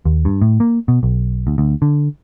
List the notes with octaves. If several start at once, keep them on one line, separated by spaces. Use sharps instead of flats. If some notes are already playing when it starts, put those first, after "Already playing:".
D#2
G2
A2
A#3
B2
B1
D2
D2
D3